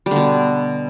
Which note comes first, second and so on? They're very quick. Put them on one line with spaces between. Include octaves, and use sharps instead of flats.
G3 D3 B2